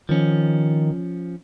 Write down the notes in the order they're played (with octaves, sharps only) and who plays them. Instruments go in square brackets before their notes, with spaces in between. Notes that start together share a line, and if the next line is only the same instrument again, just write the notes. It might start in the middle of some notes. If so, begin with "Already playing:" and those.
[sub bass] D#3 [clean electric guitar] F3 C#4